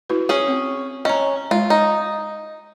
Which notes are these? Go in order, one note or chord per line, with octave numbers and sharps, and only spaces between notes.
E4 F#4 B4
C#4 G#4
C4
C#4 D#5 A#5
G#3 F4
D#4